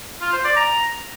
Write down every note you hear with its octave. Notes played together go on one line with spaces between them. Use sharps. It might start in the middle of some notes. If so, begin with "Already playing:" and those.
F4
C5
D5
A#5